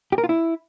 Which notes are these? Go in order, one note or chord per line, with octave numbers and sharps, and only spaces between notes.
G4
A#4
F4
E4